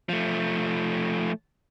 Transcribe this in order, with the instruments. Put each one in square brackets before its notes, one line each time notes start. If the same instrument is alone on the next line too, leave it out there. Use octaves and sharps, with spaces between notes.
[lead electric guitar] F3 A3